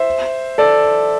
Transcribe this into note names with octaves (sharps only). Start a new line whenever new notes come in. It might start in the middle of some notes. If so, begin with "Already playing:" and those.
Already playing: C5 E5
A4 D5